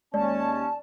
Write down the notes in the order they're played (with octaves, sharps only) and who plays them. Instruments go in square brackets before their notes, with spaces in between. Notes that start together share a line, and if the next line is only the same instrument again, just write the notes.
[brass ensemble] D#2 C#4 [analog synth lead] G#3 [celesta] D5 [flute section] A5